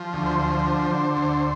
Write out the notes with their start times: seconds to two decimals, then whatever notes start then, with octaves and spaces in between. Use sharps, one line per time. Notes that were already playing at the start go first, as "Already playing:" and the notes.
Already playing: F3
0.13 D2
0.26 C5
0.39 F3
0.65 D3
0.91 D3
1.17 D2